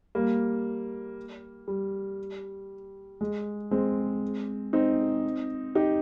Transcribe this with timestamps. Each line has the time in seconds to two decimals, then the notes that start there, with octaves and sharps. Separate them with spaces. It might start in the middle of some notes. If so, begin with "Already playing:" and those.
0.15 G3 A#3
1.68 G3
3.21 G#3
3.71 G#3 C4
4.73 C4 D#4
5.75 D#4 G4